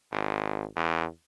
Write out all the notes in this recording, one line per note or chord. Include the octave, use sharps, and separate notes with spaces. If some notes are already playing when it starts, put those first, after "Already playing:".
G#1
E2